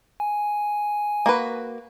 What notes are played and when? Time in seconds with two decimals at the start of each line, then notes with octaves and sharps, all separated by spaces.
0.20 G#5
1.26 A#3 F#4 B4